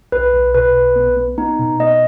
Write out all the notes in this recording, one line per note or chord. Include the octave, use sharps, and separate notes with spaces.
B1 B4
B1
B2 B4
B1
B3
B3
B3 D#4
B2
B3 D#5